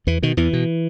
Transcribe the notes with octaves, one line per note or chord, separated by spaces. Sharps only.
E2 E3
B2 D#3
E2 E3
B2